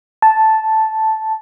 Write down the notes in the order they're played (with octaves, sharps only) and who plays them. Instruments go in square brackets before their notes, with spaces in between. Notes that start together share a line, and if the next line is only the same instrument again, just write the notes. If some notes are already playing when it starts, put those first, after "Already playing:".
[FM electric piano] A5